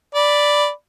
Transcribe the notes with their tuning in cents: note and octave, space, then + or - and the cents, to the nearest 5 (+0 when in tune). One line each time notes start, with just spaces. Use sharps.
D5 +0 B5 +0